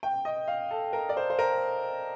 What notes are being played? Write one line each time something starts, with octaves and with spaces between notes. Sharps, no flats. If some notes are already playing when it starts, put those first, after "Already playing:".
G5
D#5
F5
A4
A#4
D5
C5
C5
A#4